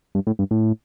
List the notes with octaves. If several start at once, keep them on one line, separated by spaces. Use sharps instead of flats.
G2
A2
G2
A2